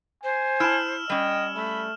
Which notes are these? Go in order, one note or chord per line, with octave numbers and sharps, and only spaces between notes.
C5 G#5
E4 A5 E6 F6 E7
G3 C#4 D#5 G5
A3 B5